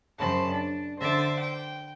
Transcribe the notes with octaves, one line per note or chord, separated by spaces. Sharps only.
F#2 C#3 C5 A5 B5
D4
D3 C5 E5 D6
G5